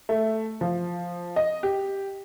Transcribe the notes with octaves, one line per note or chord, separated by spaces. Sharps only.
A3
F3
D#5
G4